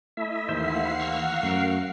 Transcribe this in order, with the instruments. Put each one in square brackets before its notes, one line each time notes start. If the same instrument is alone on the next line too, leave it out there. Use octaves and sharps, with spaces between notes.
[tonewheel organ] A3 E4 E5 [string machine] D#5
[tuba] D#2 [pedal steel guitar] E3 A#3 C5 [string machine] F5 F#5 C7
[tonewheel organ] A#5 C#6 E6
[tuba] F#2 [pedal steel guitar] A3 A#4